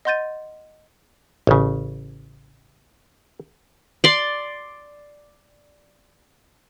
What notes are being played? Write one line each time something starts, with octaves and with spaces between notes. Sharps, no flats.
D#5 F#5 C6 G6 A6 D#7
A1 C#3
D5 C6